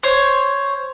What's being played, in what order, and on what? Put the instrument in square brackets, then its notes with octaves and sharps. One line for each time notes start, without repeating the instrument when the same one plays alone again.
[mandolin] C5 C#5